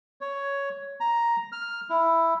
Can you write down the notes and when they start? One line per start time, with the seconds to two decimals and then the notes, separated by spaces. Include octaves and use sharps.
0.21 C#5
1.00 A#5
1.52 F6
1.90 E4